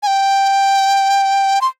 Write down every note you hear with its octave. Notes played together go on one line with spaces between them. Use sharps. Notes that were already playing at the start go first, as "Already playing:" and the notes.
G#5
G5
C6